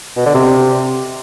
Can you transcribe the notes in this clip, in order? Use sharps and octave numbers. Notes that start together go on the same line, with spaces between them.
B2
D3
C3